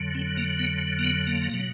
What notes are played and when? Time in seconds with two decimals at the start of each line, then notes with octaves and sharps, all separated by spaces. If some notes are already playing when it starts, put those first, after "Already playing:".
Already playing: F2 D3 F#3
0.15 C4
0.37 A#3
0.59 B3
0.99 A#3
1.04 B3
1.27 A#3
1.51 B2 F#3